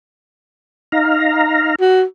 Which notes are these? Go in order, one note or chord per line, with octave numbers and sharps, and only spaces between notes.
D#4 F5 A#5
F#4